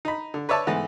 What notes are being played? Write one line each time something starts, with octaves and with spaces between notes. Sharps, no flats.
D#4 B5
D3
B4 C#5 D5 E5 A5
G#2 E3 A3 B3